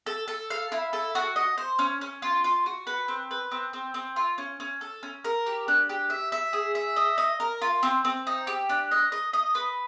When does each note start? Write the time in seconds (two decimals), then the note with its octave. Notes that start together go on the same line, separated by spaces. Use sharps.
0.06 A4
0.28 A4
0.50 F5
0.72 E4
0.93 A4
1.15 F#4
1.36 D#5
1.58 C5
1.79 C#4
2.01 C#4
2.22 F4
2.44 F4
2.66 F#4
2.87 B4
3.08 C4
3.31 B4
3.51 C4
3.73 C4
3.94 C4
4.16 F4
4.38 C#4
4.60 C#4
4.81 A4
5.03 C#4
5.24 A#4
5.46 G4
5.68 D4
5.89 G4
6.10 E5
6.32 E5
6.53 G#4
6.75 E5
6.96 D#5
7.18 D#5
7.40 A#4
7.62 F4
7.83 C4
8.05 C4
8.27 D#4
8.47 G4
8.69 D4
8.91 D#5
9.12 D#5
9.33 D#5
9.55 B4